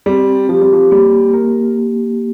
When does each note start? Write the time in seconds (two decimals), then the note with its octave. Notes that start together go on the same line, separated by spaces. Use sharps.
0.06 G3 C4
0.49 F3 G4
0.61 G3
0.73 F3
0.91 G3 A#3
1.33 A#3 A#4